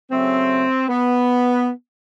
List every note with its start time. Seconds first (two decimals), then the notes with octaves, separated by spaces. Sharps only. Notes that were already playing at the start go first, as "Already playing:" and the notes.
0.11 C#3 F#3 A3 C4
0.88 B3